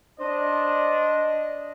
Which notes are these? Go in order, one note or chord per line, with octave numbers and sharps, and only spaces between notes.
D4 C5 D#5